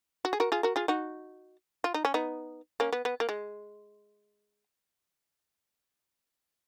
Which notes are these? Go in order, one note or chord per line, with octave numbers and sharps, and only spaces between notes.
F#4
G#4
F#4 A#4
F4 G#4
F#4 A#4
F4 G#4
D#4 F#4
F4
D#4
C#4
B3 D#4
A#3 C#4
B3
B3
A#3
G#3